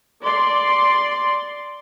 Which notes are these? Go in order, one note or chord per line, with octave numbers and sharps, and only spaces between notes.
D5 C6